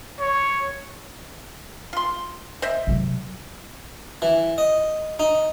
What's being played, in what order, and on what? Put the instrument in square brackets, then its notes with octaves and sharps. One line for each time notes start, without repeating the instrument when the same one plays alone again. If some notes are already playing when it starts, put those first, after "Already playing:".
[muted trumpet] C#5
[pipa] F4 C6
C5 D#5 E5
[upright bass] C3 F#3
[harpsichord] E3
D#5
D#4